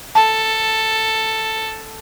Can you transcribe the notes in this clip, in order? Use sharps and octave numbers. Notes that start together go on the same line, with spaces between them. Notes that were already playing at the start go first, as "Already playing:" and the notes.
A4 A5